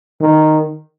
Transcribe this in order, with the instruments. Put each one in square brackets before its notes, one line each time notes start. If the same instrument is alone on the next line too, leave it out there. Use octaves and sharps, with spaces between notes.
[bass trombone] D#3